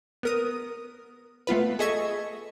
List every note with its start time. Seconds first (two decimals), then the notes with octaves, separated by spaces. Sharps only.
0.23 B3 A#4 D#6
1.47 A3 B3 F4 B4
1.79 G#4 A4 D#5 E5 C#6 G#6